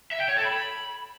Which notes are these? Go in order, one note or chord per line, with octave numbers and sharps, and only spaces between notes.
E5
G5
C#5
A4
B5